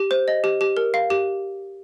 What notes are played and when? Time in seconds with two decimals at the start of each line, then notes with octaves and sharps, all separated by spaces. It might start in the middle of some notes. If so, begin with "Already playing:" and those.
Already playing: G4
0.11 C5
0.28 D#5
0.44 G4
0.61 G4
0.77 A#4
0.94 F5
1.10 G4